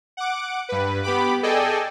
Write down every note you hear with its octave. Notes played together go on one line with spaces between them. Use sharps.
F#5 D6
G2 B4
B3 G4 B5 D6
G#4 A4 D5 D#5 G5 G#5